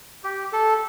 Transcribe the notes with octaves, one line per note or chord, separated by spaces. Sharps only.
G4
A4